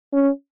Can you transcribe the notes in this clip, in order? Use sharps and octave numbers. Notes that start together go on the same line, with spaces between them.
C#4